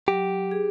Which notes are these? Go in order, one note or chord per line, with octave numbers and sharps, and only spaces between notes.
F#3 G4
G#4